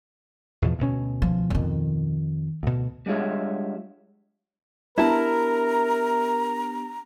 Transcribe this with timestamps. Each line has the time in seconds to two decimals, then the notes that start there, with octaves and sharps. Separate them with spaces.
0.62 E2 B2 F3
0.79 D2 B2 C#4
1.22 F3
1.50 F2 D#3
2.63 D2 B2
3.06 G3 G#3 D4 F4 C#5 E5
4.98 B3 D4 E4 G4 A#4 A5 A#5